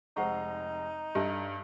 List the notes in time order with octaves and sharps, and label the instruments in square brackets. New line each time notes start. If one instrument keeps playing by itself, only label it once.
[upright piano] F1 G#3 A#5 [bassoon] D#4 [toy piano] C5 F#5 C#6
[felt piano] G2 [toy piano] G4 E5 [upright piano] A4 D#5